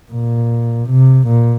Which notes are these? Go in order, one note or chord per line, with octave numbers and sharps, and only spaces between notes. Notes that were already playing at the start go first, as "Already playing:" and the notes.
A#2
C3
A#2